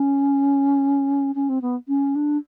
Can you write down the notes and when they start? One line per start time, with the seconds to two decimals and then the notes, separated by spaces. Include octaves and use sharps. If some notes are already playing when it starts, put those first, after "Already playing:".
Already playing: C#4
1.35 C#4
1.49 C4
1.62 B3
1.88 C#4
2.15 D4